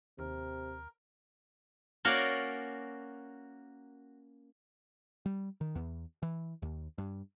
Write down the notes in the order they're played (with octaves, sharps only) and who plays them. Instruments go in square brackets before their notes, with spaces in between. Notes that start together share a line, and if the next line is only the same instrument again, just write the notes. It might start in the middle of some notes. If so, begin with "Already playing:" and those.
[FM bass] D#2 [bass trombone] C3 [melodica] A#4
[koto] A#3 C#4 F#4 A#4 D5 F5
[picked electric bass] G3
D#3
E2
E3
D#2
G2